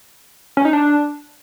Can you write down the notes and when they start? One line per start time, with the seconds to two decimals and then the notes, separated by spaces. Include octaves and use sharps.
0.57 C#4
0.65 D#4
0.73 D4